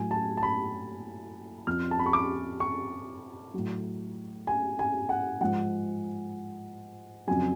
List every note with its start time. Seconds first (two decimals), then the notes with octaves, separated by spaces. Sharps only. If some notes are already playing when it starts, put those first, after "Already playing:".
Already playing: A2 F#3 G#5
0.11 A5
0.37 A5
0.43 B5
1.67 F2 F3 F6
1.91 A5
1.99 B5
2.06 C#6
2.13 D6
2.60 C#6
3.54 A2 F#3
4.47 G#5
4.79 G#5
5.09 F#5
5.41 G#2 F3 F#5
7.27 F2 C#3 F#3 G#5